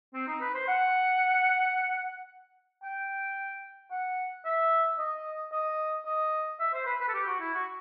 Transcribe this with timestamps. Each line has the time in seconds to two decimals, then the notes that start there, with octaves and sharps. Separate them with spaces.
0.14 C4
0.27 D#4
0.41 B4
0.54 C5
0.68 F#5
2.83 G5
3.91 F#5
4.45 E5
4.98 D#5
5.52 D#5
6.06 D#5
6.60 E5
6.73 C5
6.86 B4
7.01 B4
7.08 A4
7.14 G4
7.27 F#4
7.40 E4
7.54 F#4